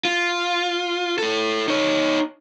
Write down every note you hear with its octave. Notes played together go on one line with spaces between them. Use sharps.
F4
E4 A4
D#4 C#5